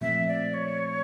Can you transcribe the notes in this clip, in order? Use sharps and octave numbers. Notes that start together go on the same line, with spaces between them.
A#2 F3 A3 C4 E5
D5
C#5